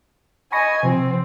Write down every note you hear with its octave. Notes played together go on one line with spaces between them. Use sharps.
D#5 G#5 B5 C#6 A#6
C3 F3 C4